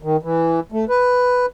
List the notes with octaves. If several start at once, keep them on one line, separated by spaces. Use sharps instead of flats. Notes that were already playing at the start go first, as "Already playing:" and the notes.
D#3
E3
A3
B4